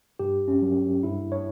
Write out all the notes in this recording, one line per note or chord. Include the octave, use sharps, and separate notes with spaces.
G2 G4
C#4
F#3
G2 E4
C#5